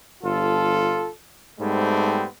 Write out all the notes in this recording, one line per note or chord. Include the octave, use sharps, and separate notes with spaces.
G1 F4 A4
G#2 G3 A3 B3 C4